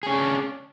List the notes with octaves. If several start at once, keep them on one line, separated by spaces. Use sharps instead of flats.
C#4 D4 G#4